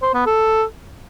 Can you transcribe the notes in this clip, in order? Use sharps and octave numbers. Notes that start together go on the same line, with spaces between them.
C5
B3
A4